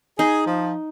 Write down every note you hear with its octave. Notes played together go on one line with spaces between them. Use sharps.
D#4 G#4
F3